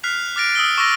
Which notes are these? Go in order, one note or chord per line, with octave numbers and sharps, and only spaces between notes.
F6 F#6 B6 C7 F7
D6 F6 A6 A#6 D7
D#6 E6 G7
C#6 D6 E6 A6 A#6 D#7